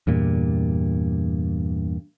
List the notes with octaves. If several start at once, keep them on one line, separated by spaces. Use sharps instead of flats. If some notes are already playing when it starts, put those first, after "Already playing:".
E2 G2 A#2